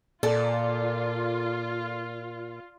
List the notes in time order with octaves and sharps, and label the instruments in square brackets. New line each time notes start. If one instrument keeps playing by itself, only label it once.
[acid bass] A#2 [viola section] F4 [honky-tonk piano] A4 [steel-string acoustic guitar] D5